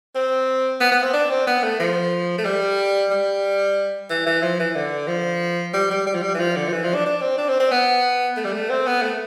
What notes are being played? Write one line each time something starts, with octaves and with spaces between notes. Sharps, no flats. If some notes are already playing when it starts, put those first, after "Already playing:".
C4
B3
B3
C4
D4
C4
B3
A3
F3
A3
G3
G3
E3
E3
F3
E3
D3
F3
G3
G3
G3
F3
G3
E3
F3
D3
F3
E3
F3
D4
D4
C4
D4
C4
C4
B3
A3
G3
A3
C4
B3
A3